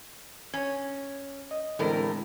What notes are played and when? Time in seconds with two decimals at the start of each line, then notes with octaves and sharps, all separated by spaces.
0.54 C#4 C#5 G#6
1.51 D#5
1.79 E2 A2 D3 G#3 C4 A#4